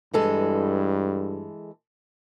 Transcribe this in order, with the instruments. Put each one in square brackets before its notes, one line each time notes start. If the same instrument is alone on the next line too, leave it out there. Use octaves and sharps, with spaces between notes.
[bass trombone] G2 [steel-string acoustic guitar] E3 G#3 A4